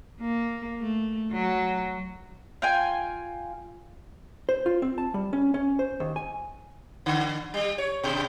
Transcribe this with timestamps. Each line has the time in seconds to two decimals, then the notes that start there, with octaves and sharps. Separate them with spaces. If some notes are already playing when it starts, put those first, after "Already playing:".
0.21 A#3
0.80 A3
1.32 F#3
2.62 F4 G5 G#5
4.49 C5
4.66 F4
4.82 C4
4.98 A5
5.14 G3
5.33 C#4
5.54 C#4
5.79 C5
6.00 D#2
6.16 G#5
7.06 D3
7.54 G3
7.78 C#5
8.03 B2